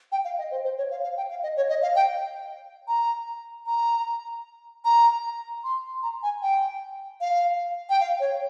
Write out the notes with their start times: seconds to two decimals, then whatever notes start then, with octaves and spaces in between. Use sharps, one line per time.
0.12 G5
0.25 F5
0.38 D#5
0.51 C5
0.64 C5
0.78 C#5
0.91 F5
1.04 F5
1.17 G5
1.30 F5
1.43 D#5
1.57 C#5
1.69 D#5
1.82 F5
1.96 G5
2.88 A#5
3.66 A#5
4.85 A#5
5.64 C6
6.03 A#5
6.23 G#5
6.42 G5
7.21 F5
7.90 G5
8.00 F5
8.20 C#5